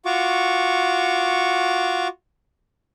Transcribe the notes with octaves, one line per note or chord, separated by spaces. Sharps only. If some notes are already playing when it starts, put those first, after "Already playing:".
F4 F#4 C#6 D6